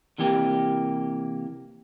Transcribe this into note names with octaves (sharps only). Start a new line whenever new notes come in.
C3 E3 A#3 G4